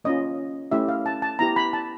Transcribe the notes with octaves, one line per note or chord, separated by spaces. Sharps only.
A#3 C#4 F4 D#5
A3 C#4 E4 G4 E5
F5
A5
A5
B3 E4 G4 A#5
B5
A5